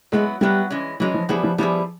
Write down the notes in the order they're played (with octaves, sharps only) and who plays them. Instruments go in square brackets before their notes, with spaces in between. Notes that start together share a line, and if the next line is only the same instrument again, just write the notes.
[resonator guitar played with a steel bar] F#3 B3 E4 [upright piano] G#3
[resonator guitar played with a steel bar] F#3 B3 E4 [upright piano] G3
[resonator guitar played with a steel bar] E3 G#3 C#4
[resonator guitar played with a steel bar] E3 G#3 C#4 [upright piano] F#3
[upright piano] F3
[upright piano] F3 [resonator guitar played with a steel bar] G3 B3 E4 G#4
[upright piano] F3
[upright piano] F3 [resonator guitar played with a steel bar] G3 B3 E4 G#4